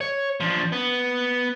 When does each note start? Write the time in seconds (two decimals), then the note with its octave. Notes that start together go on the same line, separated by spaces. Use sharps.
0.01 C#5
0.40 F3 D4
0.72 B3